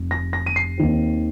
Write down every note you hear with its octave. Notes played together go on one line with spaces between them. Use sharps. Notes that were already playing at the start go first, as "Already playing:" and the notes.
Already playing: F1
A#6
A#6
D#7
C7
D#2 D#3 C4